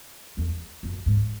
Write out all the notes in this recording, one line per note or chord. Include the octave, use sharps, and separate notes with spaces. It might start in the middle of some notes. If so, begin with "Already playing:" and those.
E2
F#2
G#2